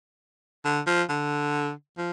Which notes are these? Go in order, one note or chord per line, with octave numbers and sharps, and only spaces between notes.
D3
F3
D3
F3